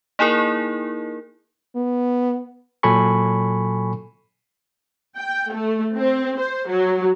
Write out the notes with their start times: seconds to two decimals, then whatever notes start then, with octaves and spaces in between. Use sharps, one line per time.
0.19 A#3 D#4 E4 G#4 A#4
1.76 B3
2.83 A#2 F#3 A4 G#5 B5 C#6
5.18 G5
5.53 A3
5.96 C4
6.39 C5
6.68 F#3